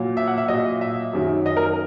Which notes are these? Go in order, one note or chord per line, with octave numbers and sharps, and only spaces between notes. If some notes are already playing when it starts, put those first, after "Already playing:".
Already playing: A#2 F#3
E5
F#5
E5
A#2 F#3 D#5
E5
F#2 D#3 F#3
D#5
A#4